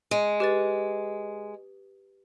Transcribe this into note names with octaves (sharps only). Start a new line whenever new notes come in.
G#3
G4 B4 A6